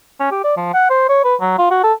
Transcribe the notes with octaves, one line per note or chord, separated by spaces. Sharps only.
C#4
G4
D5
F3
F#5
C5
C#5
B4
F#3
F4
F#4
A4